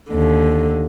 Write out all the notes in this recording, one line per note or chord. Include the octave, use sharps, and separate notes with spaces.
D#2 D3